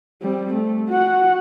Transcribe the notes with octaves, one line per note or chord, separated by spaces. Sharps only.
G3 C4
A3
F#4 F#5